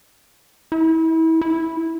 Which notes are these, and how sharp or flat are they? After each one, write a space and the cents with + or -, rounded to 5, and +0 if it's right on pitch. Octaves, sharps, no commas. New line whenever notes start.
E4 -30
E4 -10